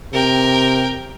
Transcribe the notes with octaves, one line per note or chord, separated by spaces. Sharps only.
C3 A#4 G5